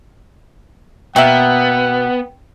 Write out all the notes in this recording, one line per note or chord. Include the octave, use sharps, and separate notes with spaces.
B2 A#3 B3 E5 F#5 G5